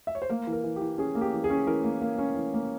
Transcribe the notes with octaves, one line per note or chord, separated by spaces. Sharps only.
E5
C#5
C5
A#3 A#4
E3
A#4
E3
G4
E3
C#4 G#4
A#3
G4
E3
G#4
C#4
E3 A#4
A#3
A#3
C#4
E3
A#3